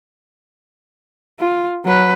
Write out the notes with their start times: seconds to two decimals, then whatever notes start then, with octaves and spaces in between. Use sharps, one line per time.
1.39 F4
1.85 F#3 B4